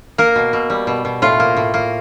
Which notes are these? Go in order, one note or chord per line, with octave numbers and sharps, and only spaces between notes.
A#3 A#4
B2
B2
G3
B2
B2
A2 F4
A#3
A2
A#3